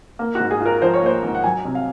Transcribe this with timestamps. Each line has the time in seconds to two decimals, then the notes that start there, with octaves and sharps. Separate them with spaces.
0.19 A#3
0.35 G#2 F#4
0.51 G#4
0.61 F4
0.66 A#4
0.81 F3 C5
0.94 C#5
1.02 A#3 C5
1.23 G#2
1.35 F#5
1.44 F#3 G#5
1.65 C2
1.75 F5